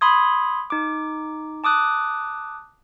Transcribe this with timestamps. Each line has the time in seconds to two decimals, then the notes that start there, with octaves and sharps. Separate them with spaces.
0.01 B5 C6 D#6 G#6
0.70 D#4 D6
1.64 A5 D6 D#6 F#6